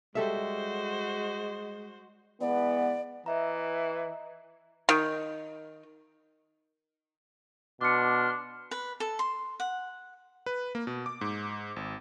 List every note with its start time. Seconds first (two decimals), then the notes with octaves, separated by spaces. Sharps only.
0.15 G3 G#3 F#4 A4 C5 E5
2.41 E3 G#3 B3 D5
3.26 E3 D#5 E5 A#5
4.89 D#3
7.81 B2 D4 C6 D6 F6 C#7
8.71 B4
9.00 A4
9.19 C6
9.60 F#5
10.46 B4
10.75 A#3
10.87 B2
11.06 D6
11.21 G#2
11.76 G#1